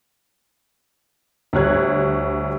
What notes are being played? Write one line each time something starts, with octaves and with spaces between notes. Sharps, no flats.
D2 G3 C#5 F#6 G#6